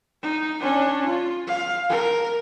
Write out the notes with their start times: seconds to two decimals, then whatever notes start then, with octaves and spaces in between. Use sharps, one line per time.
0.23 D#4
0.61 C#4 D4
1.06 F4
1.47 F5
1.89 A#4